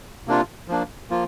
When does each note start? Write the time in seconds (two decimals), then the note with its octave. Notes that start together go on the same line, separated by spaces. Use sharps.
0.27 C3 A#3 D4 F4
0.68 F3 A#3 D4
1.10 F3 A#3 F4